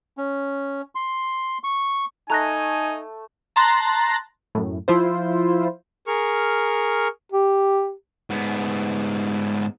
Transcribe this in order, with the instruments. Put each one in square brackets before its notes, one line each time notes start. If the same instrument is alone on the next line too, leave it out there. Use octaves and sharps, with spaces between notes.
[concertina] C#4
C6
C#6
[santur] A3 [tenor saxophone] D#4 [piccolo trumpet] G#5 [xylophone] A#5 F#6 A#6
[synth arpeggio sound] A5 A#5 C6 F#6 A6 A#6
F#2 A2
F3 E4 F4 C5
[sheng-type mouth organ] G#4 A#4 C#6 F6
[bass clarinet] G4
[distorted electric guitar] G#2 B3